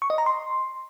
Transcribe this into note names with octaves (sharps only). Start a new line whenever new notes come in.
C#6
D#5
A#5
C6